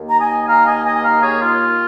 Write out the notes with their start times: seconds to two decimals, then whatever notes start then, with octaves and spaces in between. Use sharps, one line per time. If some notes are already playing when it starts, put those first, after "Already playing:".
Already playing: D#2 D#3 A#3
0.09 A#5
0.20 D#5 G#5
0.47 F5 A#5
0.66 D#5 G#5
0.85 D#5 G#5
0.95 G#5
1.04 F5 A#5
1.22 G#4 C#5
1.41 F4